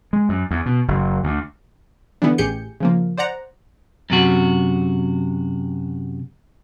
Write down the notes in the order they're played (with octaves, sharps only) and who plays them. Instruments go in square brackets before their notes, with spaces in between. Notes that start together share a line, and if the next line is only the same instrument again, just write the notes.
[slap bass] G#3
F#2
E2
B2
F#1
D2
[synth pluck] D3 E3 G3 B3 E4
A1 G4 G#4 G6 C#7
C#3 F3 A#3
C5 D5 F#5 A#5
[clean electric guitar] F#2 C3 F#4